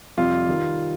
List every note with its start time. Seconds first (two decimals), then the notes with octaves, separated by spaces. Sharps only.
0.17 F2 C3 G3 F4
0.49 D#3 G3